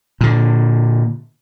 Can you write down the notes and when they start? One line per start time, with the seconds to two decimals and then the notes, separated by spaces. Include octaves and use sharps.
0.21 A#2 D3